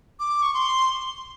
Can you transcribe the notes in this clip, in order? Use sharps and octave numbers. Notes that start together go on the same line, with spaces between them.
D6
C#6
C6